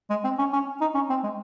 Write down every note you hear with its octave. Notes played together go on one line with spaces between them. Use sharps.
G#3
C4
C#4
C#4
D#4
C#4
C4
G#3